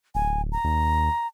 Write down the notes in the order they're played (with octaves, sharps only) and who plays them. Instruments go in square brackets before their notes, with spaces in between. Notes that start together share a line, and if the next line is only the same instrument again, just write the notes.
[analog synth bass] D1 [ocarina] G#5
[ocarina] A#5
[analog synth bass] D#2